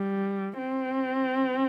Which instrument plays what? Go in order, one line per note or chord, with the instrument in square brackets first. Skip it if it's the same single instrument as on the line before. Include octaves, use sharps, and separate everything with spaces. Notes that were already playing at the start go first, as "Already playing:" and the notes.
Already playing: [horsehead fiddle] G3
C4